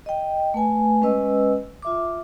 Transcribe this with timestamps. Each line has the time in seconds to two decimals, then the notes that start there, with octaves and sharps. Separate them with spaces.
0.06 D#5 G5
0.54 A3 B4 G#5
1.02 G#3 C#4 B4 D#5 E6
1.82 F4 E5 D6